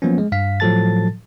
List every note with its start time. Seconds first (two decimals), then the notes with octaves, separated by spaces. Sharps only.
0.02 F3 F#3 A#3 B3 C#4
0.18 G#3
0.32 G2 F5 B6
0.60 A2 F3 F#3 A4 A5 A6